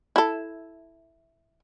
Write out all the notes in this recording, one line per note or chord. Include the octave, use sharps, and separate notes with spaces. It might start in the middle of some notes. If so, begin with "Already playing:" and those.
E4 A4